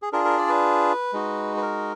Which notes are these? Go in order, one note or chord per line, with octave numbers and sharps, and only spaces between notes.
G#4
D4 F4 G#4 A#4
A#4
D5
B4
G#3 D#4 F#4
B4
A#4